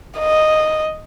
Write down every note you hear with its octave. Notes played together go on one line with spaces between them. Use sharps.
D#5